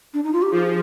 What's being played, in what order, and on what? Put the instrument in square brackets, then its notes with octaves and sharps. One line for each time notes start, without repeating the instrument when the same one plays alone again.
[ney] D4
D#4
F4
G4
[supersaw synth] F3 [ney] G#4